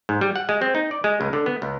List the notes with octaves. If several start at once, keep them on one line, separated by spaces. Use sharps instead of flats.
G#2
G3
F#5
G#3
C4
D#4
D5
G#3
C#2
D3
B3
C#2